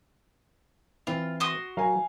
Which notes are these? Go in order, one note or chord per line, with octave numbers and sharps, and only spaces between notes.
E3 C4 E4 F4
F#4 C6 D#6
F#3 A#4 F5 G#5